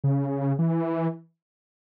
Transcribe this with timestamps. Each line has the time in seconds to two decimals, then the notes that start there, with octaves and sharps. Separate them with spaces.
0.04 C#3
0.59 E3